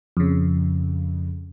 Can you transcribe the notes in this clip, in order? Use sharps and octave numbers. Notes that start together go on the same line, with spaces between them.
F2 C#3